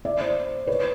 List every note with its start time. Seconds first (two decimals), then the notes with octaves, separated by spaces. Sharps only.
0.05 D5 E5
0.20 C5 D5
0.67 B4 C#5